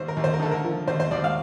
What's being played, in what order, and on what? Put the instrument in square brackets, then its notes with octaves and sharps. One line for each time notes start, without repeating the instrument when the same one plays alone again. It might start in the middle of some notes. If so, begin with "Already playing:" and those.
Already playing: [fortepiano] D#2 C5
A#4
D#2
C5
A#4
D3 A4
A#4
F3
D#2 C5
C5
D#2 D5
F5